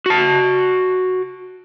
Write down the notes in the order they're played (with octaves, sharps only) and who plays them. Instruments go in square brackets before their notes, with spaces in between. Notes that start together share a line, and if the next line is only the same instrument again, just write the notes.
[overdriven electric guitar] F#4 A5